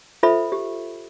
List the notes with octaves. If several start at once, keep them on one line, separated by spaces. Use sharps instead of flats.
F4 A4 C5 E5 B5
G4